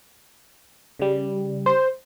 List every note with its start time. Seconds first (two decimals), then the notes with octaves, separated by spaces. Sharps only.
0.99 C#3 G3
1.66 C5